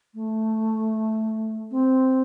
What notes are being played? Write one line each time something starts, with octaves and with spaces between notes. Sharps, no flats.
A3
C4